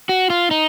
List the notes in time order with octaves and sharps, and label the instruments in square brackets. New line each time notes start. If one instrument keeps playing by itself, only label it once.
[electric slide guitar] F#4
F4
D#4